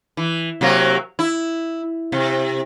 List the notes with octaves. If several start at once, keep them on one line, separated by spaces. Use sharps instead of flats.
E3
C3 F#3 A#3
E4
C3